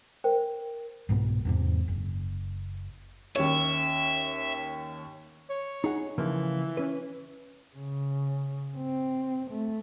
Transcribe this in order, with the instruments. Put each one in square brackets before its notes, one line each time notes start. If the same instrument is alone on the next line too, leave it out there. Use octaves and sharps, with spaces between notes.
[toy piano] A#4 C5 G5
[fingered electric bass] C2 G#2 B2 B3
E2 G#2 C3
F#1
[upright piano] D#2 C#4 C#5 [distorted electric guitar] E5
[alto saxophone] C#5
[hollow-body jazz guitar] D#4 G#4 F#5
[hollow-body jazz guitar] C#3 F3 A#3 [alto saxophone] E3
[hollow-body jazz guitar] C#4 B4
[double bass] C#3
C4
A3